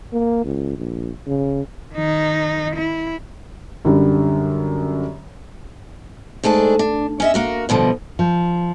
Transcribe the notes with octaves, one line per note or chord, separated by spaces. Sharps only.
A#3
C#2
A#1
C#3
D#3 D#4
E4
F#2 D3 G3
G#2 A3 D4 G#4 A5
D4
C#4 D#5 E5
A#3 F#4 A#4
G2 B2 D3 F3
F3